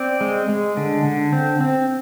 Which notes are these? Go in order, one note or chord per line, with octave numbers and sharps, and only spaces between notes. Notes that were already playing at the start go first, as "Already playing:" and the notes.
Already playing: C4 D5
G#3
G#3
D3
D3
C4
C4